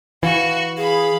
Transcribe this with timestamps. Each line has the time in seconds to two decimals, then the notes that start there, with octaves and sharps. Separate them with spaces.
0.23 E3 F#4 F5 C#6
0.77 G#4 F5 B5